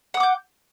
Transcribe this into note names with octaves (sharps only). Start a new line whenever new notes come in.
F#5 D6 D#6 G6